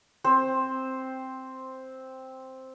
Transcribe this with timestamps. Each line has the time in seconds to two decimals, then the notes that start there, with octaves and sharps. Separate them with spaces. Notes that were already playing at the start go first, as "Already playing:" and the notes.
0.24 C4 C5